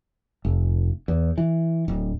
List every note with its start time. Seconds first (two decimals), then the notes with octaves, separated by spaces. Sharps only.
0.45 F1
1.08 E2
1.38 E3
1.88 D1